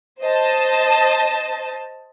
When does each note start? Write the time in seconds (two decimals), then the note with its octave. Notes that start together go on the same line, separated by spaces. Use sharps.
0.22 C5 D#5 A5